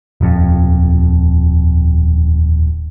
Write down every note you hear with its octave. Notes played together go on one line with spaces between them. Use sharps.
D#1 F2